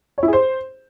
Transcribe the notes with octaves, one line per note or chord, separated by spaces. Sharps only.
C#5
E4
G#4
C5